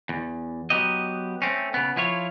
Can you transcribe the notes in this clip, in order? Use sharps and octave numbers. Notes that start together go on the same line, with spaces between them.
E2
F#3 B3 G4 D#5
A3 C4 C#4
C#3 B3
F3 E4 F4 C#5